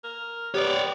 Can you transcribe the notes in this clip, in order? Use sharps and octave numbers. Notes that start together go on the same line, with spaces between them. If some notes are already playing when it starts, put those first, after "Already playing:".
A#4
B3 G4 C#5 D5